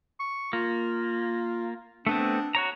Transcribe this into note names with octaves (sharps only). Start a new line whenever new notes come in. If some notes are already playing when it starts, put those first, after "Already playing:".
C#6
A#3 F4
A3 B3 C4 D4
F#4 C#5 A#5